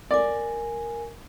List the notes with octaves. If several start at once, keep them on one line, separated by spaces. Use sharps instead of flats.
A#4 D5 G#5